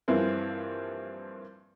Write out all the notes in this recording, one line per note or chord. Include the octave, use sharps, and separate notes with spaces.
G2 E3 F3 A#3 C4 E4